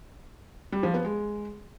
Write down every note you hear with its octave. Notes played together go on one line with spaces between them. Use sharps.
G3
F3
B3
G#3